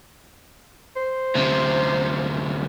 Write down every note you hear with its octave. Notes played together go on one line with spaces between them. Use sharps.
C5
D2 C3